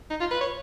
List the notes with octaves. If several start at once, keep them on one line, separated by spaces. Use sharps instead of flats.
D#4
F4
B4
C#5